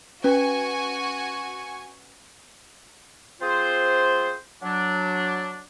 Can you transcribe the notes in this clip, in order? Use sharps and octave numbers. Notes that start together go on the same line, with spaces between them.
C#4 F#4 B4 G#5 C#6
F3 C4 F4 G#4 C5
F#3 D4